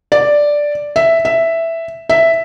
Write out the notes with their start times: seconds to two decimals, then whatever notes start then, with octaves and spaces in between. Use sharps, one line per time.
0.12 D5
0.96 E5
1.25 E5
2.09 E5